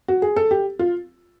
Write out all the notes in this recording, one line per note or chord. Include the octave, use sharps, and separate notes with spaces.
F#4
G#4
A4
G4
F4